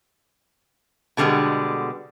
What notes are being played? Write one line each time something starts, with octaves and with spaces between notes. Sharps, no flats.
B2 D3 G3 G#3 B3